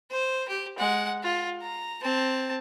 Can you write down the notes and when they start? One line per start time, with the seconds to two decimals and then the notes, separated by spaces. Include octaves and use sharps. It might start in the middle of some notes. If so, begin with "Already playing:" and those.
0.11 C5
0.48 G4
0.78 G#3 F#5
1.23 F4
1.62 A#5
2.02 C4 A5